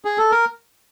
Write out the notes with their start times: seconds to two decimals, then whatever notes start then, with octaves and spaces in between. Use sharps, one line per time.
0.05 G#4
0.18 A4
0.32 A#4